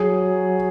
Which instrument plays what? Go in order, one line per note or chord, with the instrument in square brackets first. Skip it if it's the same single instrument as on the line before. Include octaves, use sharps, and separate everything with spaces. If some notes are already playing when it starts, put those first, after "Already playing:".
Already playing: [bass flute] F#3 [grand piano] G#4